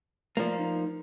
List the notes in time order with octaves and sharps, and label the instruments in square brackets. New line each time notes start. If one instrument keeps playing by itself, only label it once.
[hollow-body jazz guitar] F3 A#3 [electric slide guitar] A3 D5
[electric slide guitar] D#4